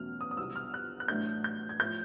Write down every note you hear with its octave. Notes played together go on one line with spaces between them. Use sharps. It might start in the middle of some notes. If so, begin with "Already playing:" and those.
Already playing: E2 B2 F#3 A3 C#4 F6
D#6
D#6
C2 B2 F#3 E6
F6
F#6
F#6
A1 A2 F#3 A3 D4 G6
G6
G#6
A2 F3 A3 G6